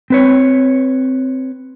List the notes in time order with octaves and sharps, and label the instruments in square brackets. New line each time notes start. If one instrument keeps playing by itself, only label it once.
[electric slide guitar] C4 B4 C#5